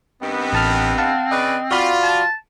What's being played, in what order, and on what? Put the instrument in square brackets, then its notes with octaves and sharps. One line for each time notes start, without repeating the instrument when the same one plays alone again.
[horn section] G2 D#3 B3 [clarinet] C4
[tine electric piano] A1 A5 F6
F5 F#5 A5
[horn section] C#3 B4 D5 [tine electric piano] D#5
[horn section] F4 [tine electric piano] F#4 D5 B5
[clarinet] A5